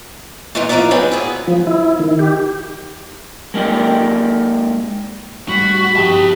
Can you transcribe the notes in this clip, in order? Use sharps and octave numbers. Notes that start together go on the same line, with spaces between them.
A#2 E3 G#3 D#4 F4 G#4
E3 F3 D#4 E4 B4 D5
F#3 C4 G#4 B4
B3 E4 G#4
F3
E4
D#3
G4
G#3 A#3 D#4 G4 D5
F#2 A2 G3 F#4 B5
G2 F3 G3 D#4 G4 A5